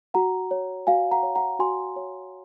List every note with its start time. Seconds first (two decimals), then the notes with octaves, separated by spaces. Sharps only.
0.14 F#4 F#5 A#5
0.51 C#5
0.87 F#4 F5 G#5
1.11 F#5 A#5
1.23 C#5
1.35 F#5 A#5
1.59 F#4 G#5 C6
1.96 C#5